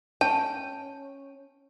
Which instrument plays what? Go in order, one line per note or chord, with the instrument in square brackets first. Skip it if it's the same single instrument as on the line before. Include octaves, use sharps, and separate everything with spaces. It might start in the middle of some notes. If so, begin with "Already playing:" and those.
[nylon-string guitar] C#4 [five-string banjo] G5 [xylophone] A5